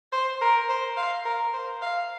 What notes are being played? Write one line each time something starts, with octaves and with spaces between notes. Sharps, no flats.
C5
A#4
C5
F5
A#4
C5
F5